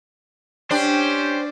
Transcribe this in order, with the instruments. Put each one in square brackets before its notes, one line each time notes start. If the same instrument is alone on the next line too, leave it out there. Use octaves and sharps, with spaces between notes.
[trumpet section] C#4 G4 G5 [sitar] D4 [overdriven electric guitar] C5